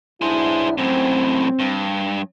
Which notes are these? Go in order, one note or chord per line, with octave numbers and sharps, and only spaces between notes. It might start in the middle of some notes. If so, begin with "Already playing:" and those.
B1 D4 E4 G#4 C5
F#2 A2 C4
G2